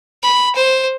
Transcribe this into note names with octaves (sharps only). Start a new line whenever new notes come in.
B5
C5